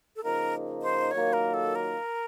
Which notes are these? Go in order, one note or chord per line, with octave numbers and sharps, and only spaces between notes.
A4
C#3 F3 A#3 D#4 A#4
C5
D#3 F#3 A#3 F4 C#5
A#4
A4
A#4